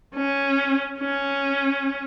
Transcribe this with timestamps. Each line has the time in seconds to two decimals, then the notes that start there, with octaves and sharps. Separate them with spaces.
0.15 C#4
1.00 C#4